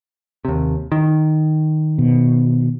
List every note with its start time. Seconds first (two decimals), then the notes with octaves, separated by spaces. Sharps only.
0.45 D#2 C3
0.92 D#3
1.98 B2